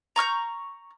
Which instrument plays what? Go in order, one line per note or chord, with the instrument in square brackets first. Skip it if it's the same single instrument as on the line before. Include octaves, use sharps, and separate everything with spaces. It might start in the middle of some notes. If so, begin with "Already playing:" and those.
[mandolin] A#5 C#6 F6 G6